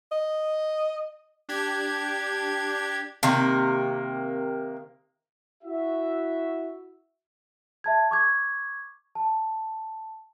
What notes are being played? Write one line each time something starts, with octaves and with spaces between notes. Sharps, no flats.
D#5
D4 G4 G#6
C3 D#3 A#3
E4 F#4 E5
E5 A5 G#6
C#6 D6 G#6
A5